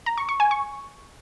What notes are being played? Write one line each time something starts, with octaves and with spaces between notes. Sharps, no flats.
A#5
C#6
C#6
G#5
C#6